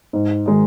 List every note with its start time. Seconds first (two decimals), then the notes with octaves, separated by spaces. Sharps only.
0.13 G#2
0.46 D#3 G#3 D#4